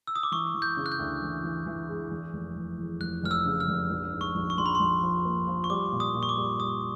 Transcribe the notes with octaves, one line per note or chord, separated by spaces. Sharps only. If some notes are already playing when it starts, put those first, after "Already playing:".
E6
D#6
D6
E3 C#6
E3
G6
C#3
F#6
G6
D2
E3
E3
E3
G#3
E2
F1
F1
E2
F1 F#6
F1 F6
E6
C#3
F6
F1
A#1
G#2
C#6
A#1
C#6
A#1 C6
B5
A#1 C6
F3
A#3
F3
C#6
G3 D6
A#2
D#6
A#2
C#6
D6
G3
G3 D#6